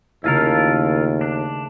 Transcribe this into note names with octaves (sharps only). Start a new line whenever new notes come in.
D#2 C#3 A3 E4 F4 A#4
D4